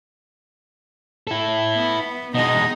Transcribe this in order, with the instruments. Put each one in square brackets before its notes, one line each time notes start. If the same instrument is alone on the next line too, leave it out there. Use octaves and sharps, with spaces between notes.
[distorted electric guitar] E4 A4
[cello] B3
[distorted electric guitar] B2 G#3 [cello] D#4 D#5